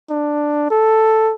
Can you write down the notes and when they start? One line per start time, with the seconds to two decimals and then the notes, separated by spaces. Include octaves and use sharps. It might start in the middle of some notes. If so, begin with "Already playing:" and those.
0.10 D4
0.71 A4